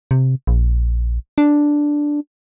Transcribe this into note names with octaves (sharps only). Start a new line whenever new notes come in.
C3
A#1
D4